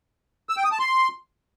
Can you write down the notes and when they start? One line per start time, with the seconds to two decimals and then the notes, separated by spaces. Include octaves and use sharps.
0.49 E6
0.57 G5
0.64 D#6
0.72 A5
0.79 C6